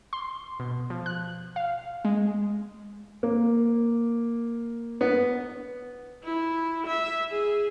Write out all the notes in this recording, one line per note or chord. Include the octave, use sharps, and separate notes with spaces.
C6
B2
F3
F#6
F5
G#3
A#3
B3
E4
E5
G#4